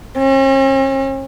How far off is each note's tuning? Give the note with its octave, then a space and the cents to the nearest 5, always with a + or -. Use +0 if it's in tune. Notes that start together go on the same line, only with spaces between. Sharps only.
C#4 -45